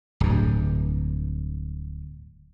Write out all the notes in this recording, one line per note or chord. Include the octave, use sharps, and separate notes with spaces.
D1 G2